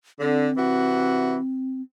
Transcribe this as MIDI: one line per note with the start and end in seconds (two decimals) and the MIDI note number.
0.19 0.49 50
0.19 1.82 60
0.57 1.37 48
0.57 1.37 52
0.57 1.37 66